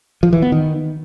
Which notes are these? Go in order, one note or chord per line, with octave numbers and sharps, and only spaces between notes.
F3
E3
B3
D#3